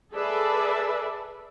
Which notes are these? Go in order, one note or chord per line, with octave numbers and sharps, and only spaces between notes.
G#4 A4 B4 D5 E5